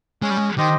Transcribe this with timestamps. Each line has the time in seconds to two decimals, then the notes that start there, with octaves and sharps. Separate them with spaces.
0.22 G#3 C#4
0.30 G3
0.37 G#3
0.57 D#3 G4 C5 D#5 G5